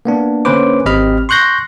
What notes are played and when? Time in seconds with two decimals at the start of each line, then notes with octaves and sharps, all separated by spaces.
0.05 A#3 B3 D4
0.45 D3 A#3 C#4 B4 C5 D6
0.86 G#1 C4 G4 D#5 B5 F6
1.29 C6 C#6 F#6 G6 A#6